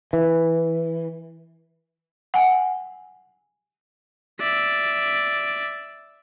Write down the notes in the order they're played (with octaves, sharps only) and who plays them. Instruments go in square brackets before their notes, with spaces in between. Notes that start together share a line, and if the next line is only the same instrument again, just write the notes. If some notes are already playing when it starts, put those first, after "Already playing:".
[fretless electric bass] E3
[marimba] F#5 G#5
[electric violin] D5 E5